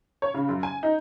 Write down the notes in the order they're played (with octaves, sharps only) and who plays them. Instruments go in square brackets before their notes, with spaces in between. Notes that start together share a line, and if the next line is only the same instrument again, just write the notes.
[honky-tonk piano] C#5
C#3
F#2
G#5
D#4